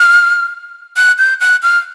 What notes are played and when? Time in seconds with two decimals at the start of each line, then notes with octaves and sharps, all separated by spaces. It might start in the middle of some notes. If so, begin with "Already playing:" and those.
Already playing: F6
0.97 F#6
1.18 G6
1.41 F#6
1.63 F6